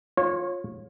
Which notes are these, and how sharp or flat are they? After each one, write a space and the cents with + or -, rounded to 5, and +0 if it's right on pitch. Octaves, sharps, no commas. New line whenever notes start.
F4 +15 C#5 -25